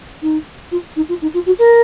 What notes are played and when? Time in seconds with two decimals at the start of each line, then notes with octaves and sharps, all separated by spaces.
0.22 D#4
0.71 F4
0.96 D#4
1.09 F4
1.22 D#4
1.34 F4
1.46 F#4
1.59 A#4